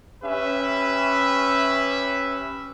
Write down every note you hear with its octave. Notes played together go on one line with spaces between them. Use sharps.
C#4 G4 B4 E5